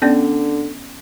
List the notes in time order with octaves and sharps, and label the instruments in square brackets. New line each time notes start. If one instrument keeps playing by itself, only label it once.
[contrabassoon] D3 [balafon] B3 C#4 D5